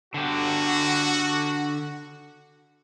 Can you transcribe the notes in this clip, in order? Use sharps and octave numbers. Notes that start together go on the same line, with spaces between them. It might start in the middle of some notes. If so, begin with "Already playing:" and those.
D3 F#4 G4